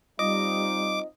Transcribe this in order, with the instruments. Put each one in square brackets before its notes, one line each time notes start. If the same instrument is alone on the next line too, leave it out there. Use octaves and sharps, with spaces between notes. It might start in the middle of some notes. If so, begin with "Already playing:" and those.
[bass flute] G3 [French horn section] C4 D#4 F4 [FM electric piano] D#5 [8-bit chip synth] D6